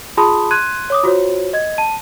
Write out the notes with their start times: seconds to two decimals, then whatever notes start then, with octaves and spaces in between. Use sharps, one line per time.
0.17 F4 G#4 A5 B5 C6 D#6
0.51 C6 F#6 G#6 D#7
0.90 C#5 D6 D#6
1.04 F4 F#4 C5 C#5
1.53 D#5 G#6
1.78 A5 D#7